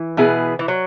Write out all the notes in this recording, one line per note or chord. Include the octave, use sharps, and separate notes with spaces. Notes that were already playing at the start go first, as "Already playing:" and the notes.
Already playing: E3
B2 B3 E4 G#4 B4
E3
F#3